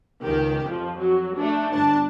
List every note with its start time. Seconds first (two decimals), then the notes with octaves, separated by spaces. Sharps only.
0.22 C#2 D#3 G4
0.65 F2 F3
0.98 F#3
1.36 A3 D4
1.71 G1 D4 A5